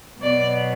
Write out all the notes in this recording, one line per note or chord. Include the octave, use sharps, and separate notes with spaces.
B2 F#3 B3 D5